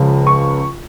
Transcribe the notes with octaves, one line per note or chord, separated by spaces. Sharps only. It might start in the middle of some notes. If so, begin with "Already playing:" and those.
Already playing: C#2 C#3 F3
C#6